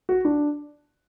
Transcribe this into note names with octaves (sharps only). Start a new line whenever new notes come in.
F#4
D4